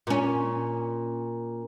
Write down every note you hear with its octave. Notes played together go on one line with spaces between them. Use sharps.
A#2 C#4